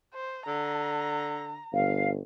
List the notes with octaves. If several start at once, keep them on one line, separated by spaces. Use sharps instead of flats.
C5
D3 A#5
G1 F5